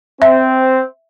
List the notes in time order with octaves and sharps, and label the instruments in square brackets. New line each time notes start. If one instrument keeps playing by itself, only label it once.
[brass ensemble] C4 [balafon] E5